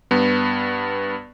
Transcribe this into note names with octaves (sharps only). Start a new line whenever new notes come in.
G2 B3